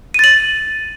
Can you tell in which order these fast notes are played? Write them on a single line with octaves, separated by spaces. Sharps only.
D#7 A6 F#7